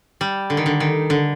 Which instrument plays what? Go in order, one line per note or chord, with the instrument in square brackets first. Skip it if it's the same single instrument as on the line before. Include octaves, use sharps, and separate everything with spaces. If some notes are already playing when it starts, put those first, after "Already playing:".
[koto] G3
D3
D#3
D3
D#3
D3